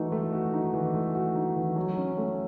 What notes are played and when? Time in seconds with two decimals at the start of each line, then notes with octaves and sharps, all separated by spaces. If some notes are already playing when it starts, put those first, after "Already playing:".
Already playing: E3 A3 D#4 F#4
0.12 A3
0.33 F#4
0.53 D#4
0.73 E3
0.94 A3
1.15 F#4
1.35 D#4
1.56 E3
1.76 F#3
1.97 C#4
2.18 A3